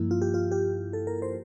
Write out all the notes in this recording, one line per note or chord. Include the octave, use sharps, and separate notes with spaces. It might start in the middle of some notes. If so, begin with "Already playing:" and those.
Already playing: G2 F3 A#3 E4
F4
G4
F4
G4
A4
A#4
C5